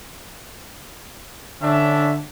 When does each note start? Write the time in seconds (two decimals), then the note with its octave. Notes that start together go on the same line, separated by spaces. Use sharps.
1.61 D3 C#4 D4 E5